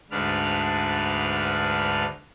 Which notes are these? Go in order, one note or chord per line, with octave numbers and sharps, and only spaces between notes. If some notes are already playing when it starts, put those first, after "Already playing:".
D2 G#2 D4 B4 F6